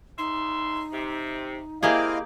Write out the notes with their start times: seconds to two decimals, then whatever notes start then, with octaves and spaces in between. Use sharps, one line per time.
0.18 C#3 D#4 E5 C6
0.93 C3
1.83 A#3 C4 E4 G4 G#4 D#5 F5